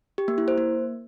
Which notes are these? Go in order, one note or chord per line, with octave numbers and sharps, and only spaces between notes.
G4
A#3
E4
C5
A#3